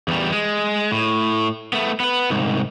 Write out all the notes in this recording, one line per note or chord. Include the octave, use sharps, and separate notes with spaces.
E2 G3
G#3
A2
A3 B3
B3 B4
C2 G#2